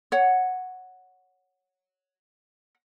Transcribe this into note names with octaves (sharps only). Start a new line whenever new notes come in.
C#5 F#5